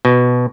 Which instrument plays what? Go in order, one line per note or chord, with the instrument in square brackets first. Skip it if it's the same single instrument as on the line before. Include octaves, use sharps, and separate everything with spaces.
[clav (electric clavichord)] B2